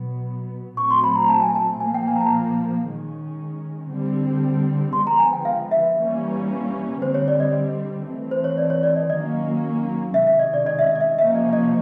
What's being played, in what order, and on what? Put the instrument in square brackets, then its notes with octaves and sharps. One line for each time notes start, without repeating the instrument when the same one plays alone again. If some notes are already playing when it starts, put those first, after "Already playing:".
Already playing: [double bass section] B2 F#3 B3
[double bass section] A#2 F#3 A3 C4 [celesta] C#6
[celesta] C6
B5
A#5
A5
G#5
A5
[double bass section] A#2 F3 A#3 [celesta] G#5
[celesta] G5
G#5
A#5
A5
[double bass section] D#3 G#3 C#4
D3 G3 C4
[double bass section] D3 F3 G#3 B3 [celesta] C6
[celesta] A#5
G#5
G5
F5
E5
[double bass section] E3 G3 A#3 C#4
[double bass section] D3 G3 C4 [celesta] C5
[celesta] C#5
D5
D#5
[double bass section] E3 A3 C4
[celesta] C5
C#5
D5
C#5
D5
D#5
[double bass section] D#3 F#3 A#3 C#4 [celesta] D#5
[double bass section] C3 D#3 G#3 C#4 [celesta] E5
[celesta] E5
D#5
D5
D#5
E5
D#5
D#5
E5
[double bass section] C3 F3 A#3 C#4 [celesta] E5
[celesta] D#5
D#5